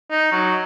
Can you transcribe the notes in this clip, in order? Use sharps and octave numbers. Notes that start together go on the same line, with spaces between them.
D#4
F#3